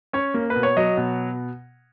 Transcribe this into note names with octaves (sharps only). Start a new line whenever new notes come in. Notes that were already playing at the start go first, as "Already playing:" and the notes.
C#4 C#5
A#3
B4
B2
C#5
F#3 D#5
B2